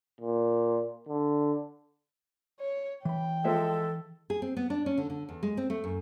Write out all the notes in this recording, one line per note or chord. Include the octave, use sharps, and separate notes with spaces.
A#2
D3
C#5
E3 G5 B5
F3 G#3 A4 E5
G#4
C4
B3
D4
C#4
D3
D3
E2
G#3
C4
A3
F#2